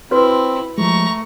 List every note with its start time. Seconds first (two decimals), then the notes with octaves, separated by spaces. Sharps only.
0.11 C4 E4 F#4 B4 C#5
0.78 F3 G#3 A3 A#5 C#6